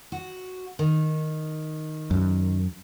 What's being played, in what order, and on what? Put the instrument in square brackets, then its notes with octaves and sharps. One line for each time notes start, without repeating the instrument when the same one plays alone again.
[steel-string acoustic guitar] F#4
D#3
[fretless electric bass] F#2